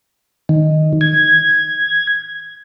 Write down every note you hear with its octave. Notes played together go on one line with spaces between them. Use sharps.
D#3
G#6